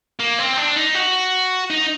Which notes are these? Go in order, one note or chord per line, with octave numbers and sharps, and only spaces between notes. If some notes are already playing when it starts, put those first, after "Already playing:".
A#3
C4
D4
D#4
F#4
D#4